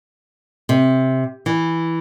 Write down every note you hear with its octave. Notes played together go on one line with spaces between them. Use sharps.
C3
E3